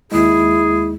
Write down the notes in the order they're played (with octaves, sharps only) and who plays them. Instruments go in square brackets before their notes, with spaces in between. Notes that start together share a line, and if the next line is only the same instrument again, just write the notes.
[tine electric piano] D#2 G#3 [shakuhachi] E4 [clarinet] G#4